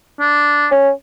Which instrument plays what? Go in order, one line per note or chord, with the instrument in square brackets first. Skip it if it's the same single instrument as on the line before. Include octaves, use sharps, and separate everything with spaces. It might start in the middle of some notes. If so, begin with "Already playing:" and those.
[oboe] D4
[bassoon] C#4